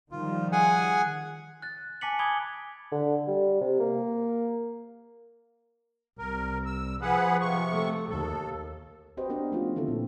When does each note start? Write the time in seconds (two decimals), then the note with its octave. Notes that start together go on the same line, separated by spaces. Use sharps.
0.11 D#3 F3 G3 F4
0.52 G#4 F#5 G#5
1.62 F#6 A6
2.01 G#5 A5 D6 B6 C#7 F#7
2.19 G#5 B5 D6 D#6 G#6 G7
2.92 D3
3.28 G3
3.61 C3
3.80 A#3
6.19 C2 A#4
6.66 E6
7.01 F3 G#4 B4 F#5
7.41 C3 C#6
7.72 A3
8.10 D#2 A4
9.17 C4 F#4 G4 B4 C5 D#5
9.30 B3 D4 A#4 C5 D#5
9.52 F3 A3 B3 C#4 F4 F#4
9.76 D3 D#3 C4 E4 A4
9.88 A#2